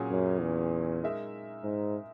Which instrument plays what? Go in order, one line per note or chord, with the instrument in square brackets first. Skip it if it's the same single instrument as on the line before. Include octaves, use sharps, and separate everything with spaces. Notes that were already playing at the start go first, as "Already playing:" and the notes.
Already playing: [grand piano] A#2 F#3 C#4 G#4
[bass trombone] F#2
E2
[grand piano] G#3 D#4 A#4 E5
[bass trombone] G#2